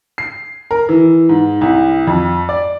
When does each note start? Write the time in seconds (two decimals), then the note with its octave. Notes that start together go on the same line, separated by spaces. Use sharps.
0.18 C7
0.71 A#4
0.89 E3
1.29 G#2
1.61 C2
2.07 F2
2.49 D5